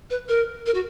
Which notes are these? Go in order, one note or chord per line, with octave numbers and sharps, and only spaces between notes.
B4
A#4
A#4
F#4